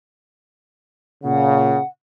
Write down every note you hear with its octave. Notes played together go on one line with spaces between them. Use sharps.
A#2 C#3 F#5